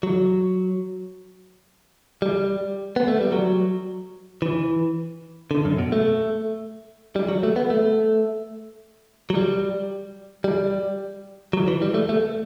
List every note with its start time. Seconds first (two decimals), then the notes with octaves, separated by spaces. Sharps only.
0.03 F#3
2.22 G3
2.96 B3
3.08 A3
3.21 G3
3.32 F#3
4.42 E3
5.51 D3
5.65 F#2
5.78 B2
5.92 A3
7.16 G3
7.29 F#3
7.43 A3
7.56 B3
7.70 A3
9.30 F#3
9.35 G3
10.44 G3
11.53 F#3
11.68 E3
11.82 G3
11.94 A3
12.09 A3